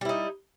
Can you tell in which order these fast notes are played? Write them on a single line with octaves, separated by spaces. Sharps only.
G3 E4 D#4